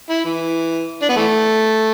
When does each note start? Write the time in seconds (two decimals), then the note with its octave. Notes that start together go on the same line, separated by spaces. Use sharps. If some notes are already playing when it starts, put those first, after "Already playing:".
0.09 E4
0.25 E3
1.02 D4
1.09 B3
1.16 E3 A3